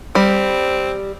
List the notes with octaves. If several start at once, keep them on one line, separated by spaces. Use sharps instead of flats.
G3 C4